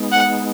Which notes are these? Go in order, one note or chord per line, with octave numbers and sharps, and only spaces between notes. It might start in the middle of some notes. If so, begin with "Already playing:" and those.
Already playing: G#3 B3 D#4
F#5